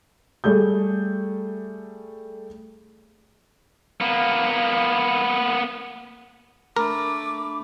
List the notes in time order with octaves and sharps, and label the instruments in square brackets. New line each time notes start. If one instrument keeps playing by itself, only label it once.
[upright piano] G3 A3 G#4 G6
[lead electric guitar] A#3 B3
[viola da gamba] A3 [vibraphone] D4 B5 [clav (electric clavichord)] A#4 [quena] D6